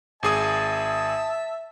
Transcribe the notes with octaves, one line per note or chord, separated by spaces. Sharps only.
G#1 G#4 E5 A5 D#6